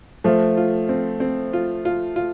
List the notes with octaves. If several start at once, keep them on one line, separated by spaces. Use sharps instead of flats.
F3 A3 F4
F4
C4
C4
F4
F4
F4